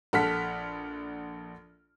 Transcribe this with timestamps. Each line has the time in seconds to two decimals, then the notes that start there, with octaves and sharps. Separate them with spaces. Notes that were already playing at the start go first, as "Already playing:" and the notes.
0.13 A#1 A4 F#5 F6 B6